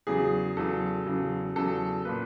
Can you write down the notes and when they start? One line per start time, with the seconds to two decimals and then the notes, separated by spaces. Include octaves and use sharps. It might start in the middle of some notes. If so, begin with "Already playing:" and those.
0.07 E2 C#3 F#3 G#4
0.57 E2 C#3 F#3 A4
1.06 E2 C#3 F#3
1.56 E2 C#3 F#3 A4
2.05 A#2 F3 A#3 B4